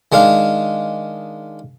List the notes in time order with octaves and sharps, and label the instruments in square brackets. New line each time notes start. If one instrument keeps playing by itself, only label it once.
[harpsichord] D#3 G#3 D4 F5